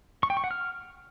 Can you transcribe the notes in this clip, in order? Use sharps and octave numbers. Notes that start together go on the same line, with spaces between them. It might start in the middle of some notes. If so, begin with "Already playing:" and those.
C#6
G5
C#6
F#5
F6